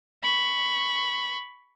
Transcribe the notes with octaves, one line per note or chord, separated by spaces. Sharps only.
B5 C#6